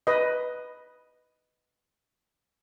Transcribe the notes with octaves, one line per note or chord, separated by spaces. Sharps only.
B4 D#5